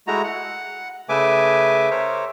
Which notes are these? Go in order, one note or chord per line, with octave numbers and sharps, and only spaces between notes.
G#3 A3 E4 F#4 A#5
F#5
C#3 A3 B4 E5 G#5 D6
A#4 C5 C#5 E5